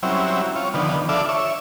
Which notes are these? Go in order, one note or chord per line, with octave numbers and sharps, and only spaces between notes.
F#3 G3 C4 C#4 E4
F4 C#5
D3 D#3 F3 B3
D4 F4 A4 D5 E5
C#5 E5